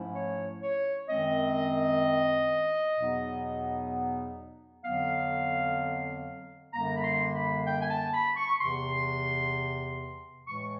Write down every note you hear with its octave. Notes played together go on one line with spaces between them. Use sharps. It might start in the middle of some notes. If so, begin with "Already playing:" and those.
Already playing: G#2 F3 A3 C#4 E4
C#5
C#5
F#2 D#3 G#3 C4 D#5
E2 B2 F#3 B3 D#4
F2 D3 F#3 B3 F5
F#2 D3 G3 A#3 A#5
B5
C6
B5
G5
G#5
A5
B5
C#6
E2 C3 E3 C6
A2 E3 G#3 C#6